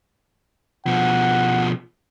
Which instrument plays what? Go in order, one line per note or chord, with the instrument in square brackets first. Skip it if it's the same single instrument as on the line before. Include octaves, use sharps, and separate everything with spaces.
[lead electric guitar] B2 F3 [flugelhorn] F#5